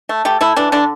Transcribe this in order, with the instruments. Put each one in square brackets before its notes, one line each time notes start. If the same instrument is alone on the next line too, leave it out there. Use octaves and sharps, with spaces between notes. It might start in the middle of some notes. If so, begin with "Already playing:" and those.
[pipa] A3
A3 G4
A3 E4
E3 D4
D3 D4